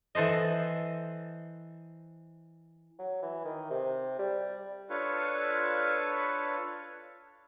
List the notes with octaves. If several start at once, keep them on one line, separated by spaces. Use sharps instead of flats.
E3 A4 C5 D#5
F#3
E3
D#3
C3
G3
D4 F4 A4 B4 C#5